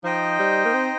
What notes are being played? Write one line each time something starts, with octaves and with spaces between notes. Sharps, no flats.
F3 D#4 C5 D#5 G5
G3
A#3
C4